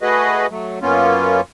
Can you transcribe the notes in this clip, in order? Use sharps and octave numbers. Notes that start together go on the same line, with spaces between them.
A3 F#4 G#4 B4 D#5
F#3 A3
F#2 A#3 B3 C#4 F4